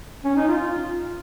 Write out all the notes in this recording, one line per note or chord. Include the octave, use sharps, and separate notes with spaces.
C#4
D#4
F4